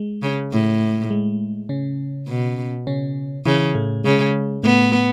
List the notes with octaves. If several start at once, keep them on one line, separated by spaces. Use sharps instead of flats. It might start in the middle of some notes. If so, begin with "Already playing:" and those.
Already playing: G#3
C#3
A2
G#3
C#3 C#4
B2
C#3 C#4
C#3 E3 E4
A2 A3
C#3 G#3
A2 A3 B3